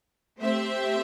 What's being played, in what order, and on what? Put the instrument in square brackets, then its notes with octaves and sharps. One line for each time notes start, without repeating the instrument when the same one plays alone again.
[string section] A3 C4 G4 C5 E5